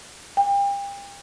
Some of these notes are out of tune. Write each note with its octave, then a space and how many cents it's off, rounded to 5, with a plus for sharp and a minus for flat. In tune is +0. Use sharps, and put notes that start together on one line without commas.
G5 +35